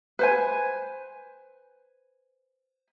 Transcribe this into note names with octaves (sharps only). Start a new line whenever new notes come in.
B4 C5 G#5